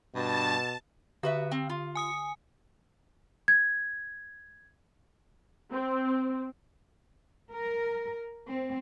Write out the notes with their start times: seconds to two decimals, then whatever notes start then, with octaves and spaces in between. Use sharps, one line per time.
0.15 G2 B2 A5
1.23 D3 F#4 B4 E5
1.52 C4
1.70 F4
1.95 G#5 D#6 C#7
3.48 G#6
5.72 C4
7.51 A#4
8.46 C4